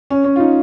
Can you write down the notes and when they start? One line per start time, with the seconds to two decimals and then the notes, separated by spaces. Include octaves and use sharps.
0.10 C#4
0.24 C#4
0.36 F4
0.40 D#4